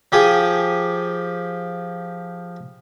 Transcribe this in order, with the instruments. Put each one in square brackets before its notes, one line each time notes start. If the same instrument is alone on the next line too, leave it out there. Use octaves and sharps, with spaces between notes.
[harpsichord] F3 G4 G#4 G#5